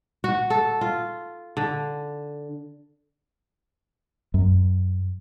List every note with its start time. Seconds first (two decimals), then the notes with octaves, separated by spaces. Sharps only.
0.24 F#4
0.50 A4
0.81 F4
1.57 D3
4.34 F#2